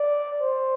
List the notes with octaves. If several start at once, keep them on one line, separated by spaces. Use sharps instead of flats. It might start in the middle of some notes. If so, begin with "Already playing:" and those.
Already playing: D5
C5